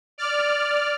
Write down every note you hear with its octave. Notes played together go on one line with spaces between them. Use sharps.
D5 F6